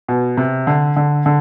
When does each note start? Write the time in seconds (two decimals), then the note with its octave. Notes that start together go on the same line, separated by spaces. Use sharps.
0.08 B2
0.37 C3
0.67 D3
0.96 D3
1.26 D3